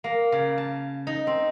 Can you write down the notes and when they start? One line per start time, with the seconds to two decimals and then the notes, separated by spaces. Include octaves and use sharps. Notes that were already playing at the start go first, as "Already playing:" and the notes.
0.04 A#3
0.32 C#3
0.58 A5
1.07 D#4
1.27 C4